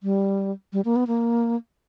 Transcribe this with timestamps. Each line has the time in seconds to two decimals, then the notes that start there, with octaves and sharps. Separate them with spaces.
0.03 G3
0.73 G3
0.85 A#3
0.96 B3
1.07 A#3